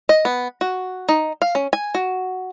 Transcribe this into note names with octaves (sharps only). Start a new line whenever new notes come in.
D#5
B3
F#4
D#4
F5
C#4
G#5
F#4